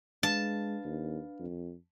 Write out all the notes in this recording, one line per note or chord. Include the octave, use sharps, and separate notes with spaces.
G#3 D4 B4 F5 A5
D#2
F2